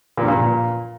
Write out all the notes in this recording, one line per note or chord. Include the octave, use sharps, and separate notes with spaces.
A#2
G2
A#2